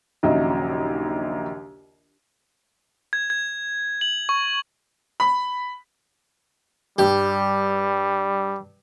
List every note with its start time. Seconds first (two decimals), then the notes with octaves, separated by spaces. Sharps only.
0.23 A#1 D#2 C#3 F#3 D#5 E5
3.13 G#6
3.30 G#6
4.01 F#7
4.29 C#6
5.20 B5
6.98 G2 G3 G4